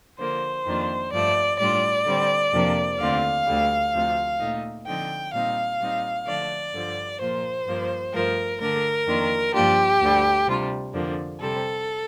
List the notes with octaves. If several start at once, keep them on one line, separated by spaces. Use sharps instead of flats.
D3 F3 A#3 C5
F2 D#3 A#3 D4 F4
G2 F3 A3 D5
A2 G3 D4 F4 D5
D3 G3 C4
F2 C3 F3 A#3 D4
D#2 D3 A3 C4 F4 F5
D2 D3 G3
D2 C3 F3
A#2 A3 D#4
D3 F3 C4 D#4 G5
A#2 G3 C4 D#4 F5
A#2 G3 C4 D#4
D3 F3 A3 D5
G2 D3 F3
A#2 F3 A#3 F4 C5
G2 F3 A#3
G2 F3 A3 A#4
D3 A3 D4 A#4
F2 D#3 A#3 D4 F4
G2 F3 A#3 D4 F4 G4
D2 D3 G3
C3 G3 D4 F4
F2 D3 F3 A#3 D4
C3 G3 C4 A4